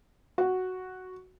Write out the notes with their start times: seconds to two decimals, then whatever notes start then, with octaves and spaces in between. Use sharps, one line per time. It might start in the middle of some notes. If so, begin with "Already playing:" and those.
0.38 F#4